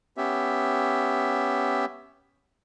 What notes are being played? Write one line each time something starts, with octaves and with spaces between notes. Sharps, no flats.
B3 C#4 G4 E5